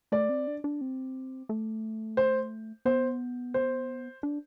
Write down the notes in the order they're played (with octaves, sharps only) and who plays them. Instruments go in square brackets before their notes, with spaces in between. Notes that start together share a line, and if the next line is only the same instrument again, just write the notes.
[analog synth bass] A3 [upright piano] D5
[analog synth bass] C4
D4
D4
C4
A3
[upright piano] C5
[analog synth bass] B3 [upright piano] C5
[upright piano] C5
[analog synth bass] D4